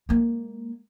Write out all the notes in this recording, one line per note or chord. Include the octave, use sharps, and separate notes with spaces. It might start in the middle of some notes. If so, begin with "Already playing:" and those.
G#3 A#3